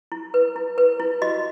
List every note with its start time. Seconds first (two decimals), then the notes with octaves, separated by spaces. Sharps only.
0.12 E4
0.34 B4
0.56 E4
0.78 B4
1.00 E4
1.22 F#4 D#5